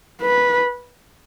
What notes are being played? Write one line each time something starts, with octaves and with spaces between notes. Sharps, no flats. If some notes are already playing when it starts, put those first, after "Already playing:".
B4